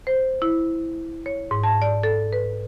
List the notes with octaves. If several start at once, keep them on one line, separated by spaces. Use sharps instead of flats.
C5
E4
C#5
G#2
A5
D5
A4
B4